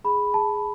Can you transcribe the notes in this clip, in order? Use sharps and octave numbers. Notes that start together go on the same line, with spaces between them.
G#4 B5
G#4 A5